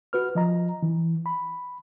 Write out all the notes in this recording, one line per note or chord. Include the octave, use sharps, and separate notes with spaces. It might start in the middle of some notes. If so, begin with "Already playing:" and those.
F#4 B4 F6
F3 D#5 A#5
E3
B5